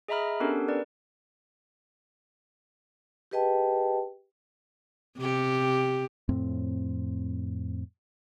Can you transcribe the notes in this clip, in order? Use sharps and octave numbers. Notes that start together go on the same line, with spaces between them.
G#4 D#5 E5 A#5 B5 F6
B3 C#4 D4 G4 A4 A#4
A#4 B4 D5
G4 G#4 B4 D#5 G5 A5
C3 G4
F2 A2 C4